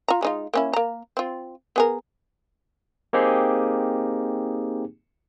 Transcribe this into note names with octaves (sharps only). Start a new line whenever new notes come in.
F4 A#5
G#3 D#4 F4
A#3 C#4 E4
A#3 A#5
C4 F4
B3 G#4 A#4
A#3 C4 D#4 G4 G#4